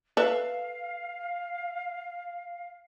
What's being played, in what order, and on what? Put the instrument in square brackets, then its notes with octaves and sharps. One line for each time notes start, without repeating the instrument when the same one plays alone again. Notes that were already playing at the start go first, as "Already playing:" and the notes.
[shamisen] A4 B4 E5 [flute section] F5